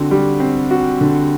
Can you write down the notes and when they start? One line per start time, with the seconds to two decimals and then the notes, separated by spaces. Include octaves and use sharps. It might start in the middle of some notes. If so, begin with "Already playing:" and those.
Already playing: D3 C4 F#4
0.11 G3
0.40 C4
0.71 F#4
1.01 D3